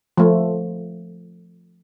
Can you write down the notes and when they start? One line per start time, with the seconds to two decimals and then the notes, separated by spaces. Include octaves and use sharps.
0.17 F3 A3